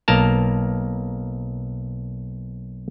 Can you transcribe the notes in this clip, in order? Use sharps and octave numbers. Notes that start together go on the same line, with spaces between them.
B1 A#3 A#4 A5